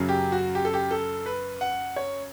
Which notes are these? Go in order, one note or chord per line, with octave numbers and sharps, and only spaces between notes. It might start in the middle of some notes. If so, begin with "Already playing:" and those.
Already playing: F#2 C#3 F#3
G4
F#4
G4
A4
G4
A4
B4
F#5
C#5